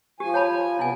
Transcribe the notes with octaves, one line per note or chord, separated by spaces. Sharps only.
F3 G4 G#5
C#5 A5 B5
C3 B3 E4 G#5